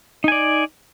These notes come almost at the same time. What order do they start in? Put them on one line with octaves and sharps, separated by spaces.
D#4 G#5 D5